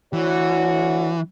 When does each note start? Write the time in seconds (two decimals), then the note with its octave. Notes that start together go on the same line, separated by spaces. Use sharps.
0.13 D2 E3 F#4 C#5